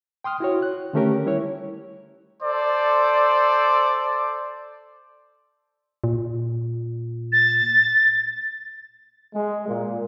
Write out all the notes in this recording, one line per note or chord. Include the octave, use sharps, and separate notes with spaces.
G5 C6 D#6 F6
E4 F#4 C#5
F#6
D3 D#3 A3 C#4 G4 A#4
G3 E4 C#5
A4 C5 D5
A#2
A6
G#3
A#2